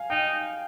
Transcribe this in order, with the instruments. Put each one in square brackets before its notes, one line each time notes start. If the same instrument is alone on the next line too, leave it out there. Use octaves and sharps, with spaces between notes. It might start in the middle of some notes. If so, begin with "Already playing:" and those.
Already playing: [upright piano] F5 G#5
[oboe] D#4 [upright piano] G5